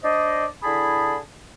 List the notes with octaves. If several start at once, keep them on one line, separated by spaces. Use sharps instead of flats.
D4 C5 D5 D#5
D3 E4 G#4 A5 B5